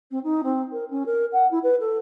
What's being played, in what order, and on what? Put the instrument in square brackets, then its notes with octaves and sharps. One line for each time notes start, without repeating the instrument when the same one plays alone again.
[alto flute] C4
D#4
C4
A#4
C#4
A#4
F#5
E4
B4
A4